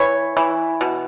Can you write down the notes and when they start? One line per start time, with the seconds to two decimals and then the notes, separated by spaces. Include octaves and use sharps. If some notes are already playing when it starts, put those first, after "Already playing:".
Already playing: E3 B4 C#5
0.37 E3
0.81 B2